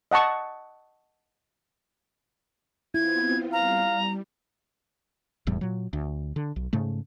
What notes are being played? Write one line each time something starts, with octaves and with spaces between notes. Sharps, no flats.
D#5 F#5 A5 C#6
B3 C4 E4 F4 G#6
G3 F5 A#5
E1 E2 A2 G3
A#2 F#3
D2
D3
B1
G#2 C#3 A3